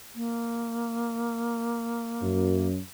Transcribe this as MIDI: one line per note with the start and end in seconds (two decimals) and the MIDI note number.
0.15 2.68 58
2.22 2.76 42